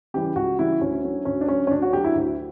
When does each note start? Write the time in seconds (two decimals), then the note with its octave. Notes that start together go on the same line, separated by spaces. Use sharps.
0.14 C#3 E3 G3 G4
0.36 C#2 F#4
0.59 C#3 E3 G3 E4
0.81 D2 C#4
1.04 D3 F#3
1.25 D2 C#4
1.41 D4
1.48 D3 F#3 C#4
1.67 C#4
1.71 D2 D4
1.82 F#4
1.93 D3 F#3 G4
2.05 E4
2.15 D2